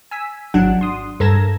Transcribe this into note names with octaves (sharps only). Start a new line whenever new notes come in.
G#5 E6 B6
G#1 F#3 D4 F#5
C6 D#6
G2 A4 A#4 G#6 A#6 E7